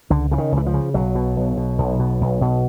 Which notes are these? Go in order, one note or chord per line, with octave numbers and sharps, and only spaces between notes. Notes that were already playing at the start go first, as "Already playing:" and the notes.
C#2 D3
C#3 E3
D#3
C#2
E3
F3
C#3
B1 F#3
B2
B1
B2
B1
B2
B1
B2